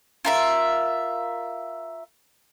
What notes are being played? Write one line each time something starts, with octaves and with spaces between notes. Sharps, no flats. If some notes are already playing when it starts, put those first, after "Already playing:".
F4 A#4 E5